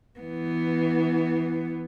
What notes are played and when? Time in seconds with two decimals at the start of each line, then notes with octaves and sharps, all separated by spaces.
0.20 E3 B3